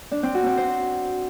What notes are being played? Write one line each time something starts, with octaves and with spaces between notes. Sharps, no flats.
D4
C4
F#4
C4
C5